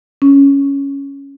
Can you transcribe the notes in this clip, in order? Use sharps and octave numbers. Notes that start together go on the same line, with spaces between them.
C#4